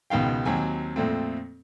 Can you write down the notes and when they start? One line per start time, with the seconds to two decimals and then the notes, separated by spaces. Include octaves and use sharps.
0.10 C#2 B2 D#3 F5 G5
0.45 D#2 F#3 C4 G#5
0.96 F2 A#2 A3 C4